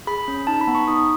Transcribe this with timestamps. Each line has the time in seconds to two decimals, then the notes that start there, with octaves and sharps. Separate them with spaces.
0.07 G#4 B5
0.28 C#4
0.47 D#4 A5
0.61 B5
0.67 B3
0.75 C#6
0.88 D#4 D#6